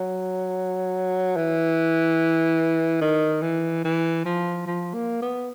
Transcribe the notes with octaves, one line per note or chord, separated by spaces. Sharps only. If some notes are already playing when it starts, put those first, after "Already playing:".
Already playing: F#3
E3
D#3
E3
E3
F3
F3
A#3
B3